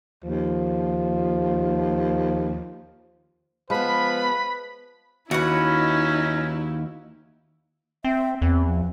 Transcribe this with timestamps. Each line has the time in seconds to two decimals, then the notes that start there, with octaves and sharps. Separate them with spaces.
0.24 D#2 F3
3.70 F3 G#3 B3 B4 B5
5.31 D#2 C#4 D#4 E4 F#4 B4
8.04 C4 E5
8.42 E2 C4
8.65 F3